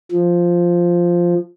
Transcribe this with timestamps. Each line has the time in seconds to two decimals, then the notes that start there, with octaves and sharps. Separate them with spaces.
0.11 F3